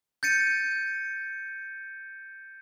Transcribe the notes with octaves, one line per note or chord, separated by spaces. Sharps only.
G6 A6 C#7 D#7